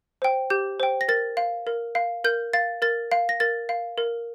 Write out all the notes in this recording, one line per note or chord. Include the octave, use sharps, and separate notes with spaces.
C5 G5
G4 G6
C5 G5
A#6
A#4 A6
F5
A#4
F5
A#4 G6
F5 A6
A#4 A6
F5
A#6
A#4 A6
F5
A#4